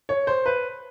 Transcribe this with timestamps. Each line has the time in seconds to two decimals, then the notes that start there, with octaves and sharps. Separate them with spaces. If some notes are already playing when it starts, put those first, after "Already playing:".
0.09 C#5
0.27 C5
0.46 B4